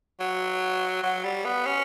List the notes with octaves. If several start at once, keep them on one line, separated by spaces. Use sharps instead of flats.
F#3
F#3
G3
B3
C#4